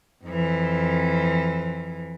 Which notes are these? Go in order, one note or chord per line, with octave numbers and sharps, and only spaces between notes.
F2 E3